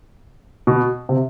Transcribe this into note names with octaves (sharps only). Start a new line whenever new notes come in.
B2
C3